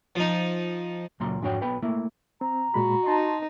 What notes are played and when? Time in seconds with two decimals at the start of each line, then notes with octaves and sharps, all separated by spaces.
0.16 F3 D#4
1.20 C#2 A#2 F#3 A#5 C6
1.42 F2 G#2 D4 F#4 C#5 G5
1.61 B1 B2 B4 G5 B5
1.82 A3 A#3 E4
2.41 C4 A#5
2.74 A#2 G#3 F#4 B5
3.06 D#4 A5 C6